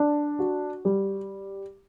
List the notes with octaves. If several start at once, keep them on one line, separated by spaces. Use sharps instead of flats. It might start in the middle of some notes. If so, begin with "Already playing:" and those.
Already playing: D4
F#4
G3